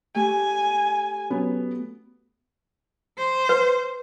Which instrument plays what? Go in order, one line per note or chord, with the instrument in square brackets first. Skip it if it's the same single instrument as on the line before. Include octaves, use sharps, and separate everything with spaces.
[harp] A3 G4 [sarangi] G#5
[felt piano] F#3 B3 C#4
[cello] C5
[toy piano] B4